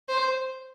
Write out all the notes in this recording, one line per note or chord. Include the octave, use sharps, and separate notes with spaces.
C5